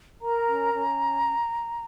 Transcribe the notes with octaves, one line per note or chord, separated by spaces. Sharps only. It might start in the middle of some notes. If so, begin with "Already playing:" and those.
A#4 A#5
C#4
C#4